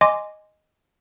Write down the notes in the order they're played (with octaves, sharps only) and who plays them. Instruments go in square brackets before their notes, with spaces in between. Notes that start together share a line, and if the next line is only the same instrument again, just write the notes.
[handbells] D#5 G#5 C6 D6